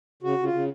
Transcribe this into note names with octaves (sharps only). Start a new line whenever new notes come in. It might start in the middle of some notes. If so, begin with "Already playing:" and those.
C#3 F#4
C#3
F4
C#3